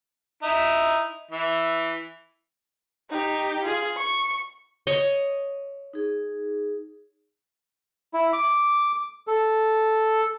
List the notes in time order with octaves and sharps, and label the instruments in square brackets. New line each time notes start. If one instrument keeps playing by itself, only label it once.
[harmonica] D#4 E4 E5
E3 E5
[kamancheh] D#4 G4
F4 G#4
C#6
[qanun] C#5 D#5
[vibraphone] D#4 G#4
[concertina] E4
D6
A4